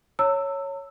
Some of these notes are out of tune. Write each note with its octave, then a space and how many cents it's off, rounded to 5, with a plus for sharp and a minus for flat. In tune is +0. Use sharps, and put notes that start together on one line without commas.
C#5 +0 A#5 -45 E6 +0